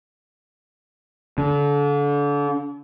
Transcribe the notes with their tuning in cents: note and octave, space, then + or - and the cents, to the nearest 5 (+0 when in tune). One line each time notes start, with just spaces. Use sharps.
D3 -35